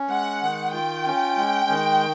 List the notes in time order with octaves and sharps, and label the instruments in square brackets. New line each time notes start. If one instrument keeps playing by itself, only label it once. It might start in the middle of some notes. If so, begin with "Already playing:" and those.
Already playing: [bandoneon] C#4
[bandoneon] G#3 [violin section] F#5
[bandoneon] D#3
[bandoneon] F4 [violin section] G5
[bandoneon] C#4
G#3
D#3